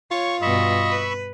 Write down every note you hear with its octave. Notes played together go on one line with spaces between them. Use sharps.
F4 C#5 C#6
G2 B2 D#5 B5 C#6 E6
B4